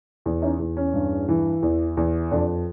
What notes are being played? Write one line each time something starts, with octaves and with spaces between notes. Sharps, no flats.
E2
C#4 D#4
E2
C#4
G2
E3
E2
E2
F2 D4